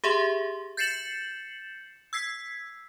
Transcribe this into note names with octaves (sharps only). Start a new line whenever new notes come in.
G4 G#4 E5 C6
G6 A6 C7 C#7 E7 F#7
E6 G#6 B6 C7